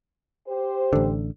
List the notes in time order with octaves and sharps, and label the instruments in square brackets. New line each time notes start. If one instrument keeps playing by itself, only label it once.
[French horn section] G4 C5
[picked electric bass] A1 D3